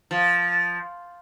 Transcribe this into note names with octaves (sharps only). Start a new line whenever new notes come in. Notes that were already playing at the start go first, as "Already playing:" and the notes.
F3